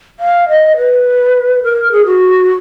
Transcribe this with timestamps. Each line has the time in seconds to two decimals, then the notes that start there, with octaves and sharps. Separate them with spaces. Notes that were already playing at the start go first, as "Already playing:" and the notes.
0.20 F5
0.49 D#5
0.77 B4
1.63 A#4
1.92 G#4
2.06 F#4